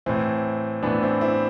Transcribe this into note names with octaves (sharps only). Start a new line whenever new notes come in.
A2 E3 C4
A2 E3 B3 D4
C4 E4
C4 E4